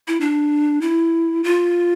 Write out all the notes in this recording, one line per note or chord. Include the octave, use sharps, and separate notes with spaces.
E4
D4
E4
F4